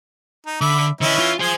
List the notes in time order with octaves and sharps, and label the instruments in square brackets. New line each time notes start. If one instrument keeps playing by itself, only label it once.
[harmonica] D#4
[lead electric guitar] D3 [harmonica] E5 B5 D6
[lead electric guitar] D3 D#5 [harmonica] E3 C#4 E4
[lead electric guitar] F4
[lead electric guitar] F4 C5 [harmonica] G#4 G#5